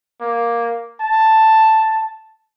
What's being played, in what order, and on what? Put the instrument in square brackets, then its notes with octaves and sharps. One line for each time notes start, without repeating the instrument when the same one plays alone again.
[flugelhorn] A#3
A5